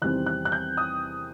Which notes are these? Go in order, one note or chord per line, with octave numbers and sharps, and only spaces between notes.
E2 C3 D#3 G3 C4 F#6
F#6
F#6
G6
D#6